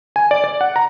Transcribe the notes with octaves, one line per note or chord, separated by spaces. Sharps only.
G#5
D5
D5
F#5
A#5